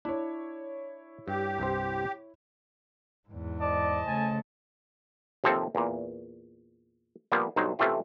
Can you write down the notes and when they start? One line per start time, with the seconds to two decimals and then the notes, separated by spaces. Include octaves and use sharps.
0.05 D4 E4 C#5
1.28 G2 G4
1.58 C2 G2 C5
3.29 E2 G#2
3.61 C5 D5 D#5 A5
4.07 C#3 A3 G#5
5.44 D#2 C3 F3 C4 A4
5.75 E2 A#2
7.32 F3 G3 A#3 B3 C5
7.56 B1 G2 F#3 D#4 C5
7.79 C3 E3 A3 C#4 F4 G4